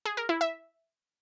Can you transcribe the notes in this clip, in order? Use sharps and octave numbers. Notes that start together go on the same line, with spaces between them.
G#4
A#4
E4
E5